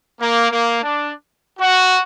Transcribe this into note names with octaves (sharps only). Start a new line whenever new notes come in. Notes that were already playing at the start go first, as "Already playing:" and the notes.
A#3
A#3
D4
F#4